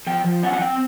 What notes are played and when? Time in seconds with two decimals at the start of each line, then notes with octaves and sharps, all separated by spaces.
0.07 F3 G5
0.24 F3
0.43 C#4 F#5
0.53 F#5
0.61 C4 G5